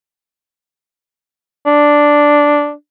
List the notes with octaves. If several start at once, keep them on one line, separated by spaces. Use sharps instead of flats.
D4